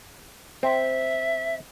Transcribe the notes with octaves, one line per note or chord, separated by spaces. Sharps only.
C4 E5